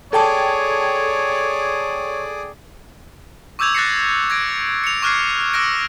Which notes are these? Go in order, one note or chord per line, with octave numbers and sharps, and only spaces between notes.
G#4 A4 C#5 D5 G5 A5
C#6 D6 E6 G6 G#6 F7
F#6 A6 A#6 C7 C#7
G#6 A#6 D7
C#7 F7
C#6 D6 F6 F#6 G#6 C7
D6 E6 F#6 A#6 D7